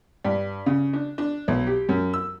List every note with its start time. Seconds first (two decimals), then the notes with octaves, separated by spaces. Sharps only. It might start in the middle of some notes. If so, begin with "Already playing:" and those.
0.25 G2
0.66 C#3
0.93 D4
1.18 D4
1.48 B1
1.67 G4
1.89 F#2
2.14 E6